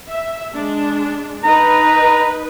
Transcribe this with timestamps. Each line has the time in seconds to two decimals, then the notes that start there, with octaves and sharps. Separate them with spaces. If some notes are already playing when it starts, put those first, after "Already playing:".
0.10 E5
0.54 G#3 D4
1.44 D#4 B4 A#5